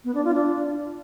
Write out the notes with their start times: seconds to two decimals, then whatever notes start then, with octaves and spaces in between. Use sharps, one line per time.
0.05 B3
0.15 D4
0.25 F4
0.35 D4